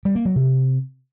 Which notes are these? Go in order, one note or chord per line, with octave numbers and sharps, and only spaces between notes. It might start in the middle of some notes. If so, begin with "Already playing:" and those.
G3
A#3
F#3
C3